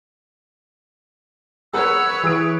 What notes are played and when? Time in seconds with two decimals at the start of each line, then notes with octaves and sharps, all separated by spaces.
1.73 G#4 A#4 B4 C#5 F#5 E6
2.24 E3 G#4 D#6 D7